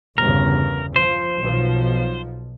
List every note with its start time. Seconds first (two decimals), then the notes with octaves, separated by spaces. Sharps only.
0.18 G1 E2 C#3 A#4
0.96 F3 C5
1.41 B1 B2 F3